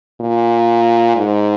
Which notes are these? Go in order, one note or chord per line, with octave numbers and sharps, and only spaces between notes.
A#2
G#2